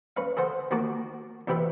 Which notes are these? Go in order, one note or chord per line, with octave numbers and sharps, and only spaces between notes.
C#4 B4 F5
G#4 A4 C5 F#5
D#2 A#3 F#4 A5 D6
E2 C3 G4 B4 E5